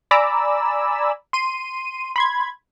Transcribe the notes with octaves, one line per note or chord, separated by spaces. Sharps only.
D5 G#5 A#5 B5 D6 E6
C6 D#7
B5 C6 G#6